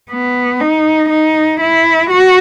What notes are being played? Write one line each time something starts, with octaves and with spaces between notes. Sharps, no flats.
B3
D#4
D#4
E4
F#4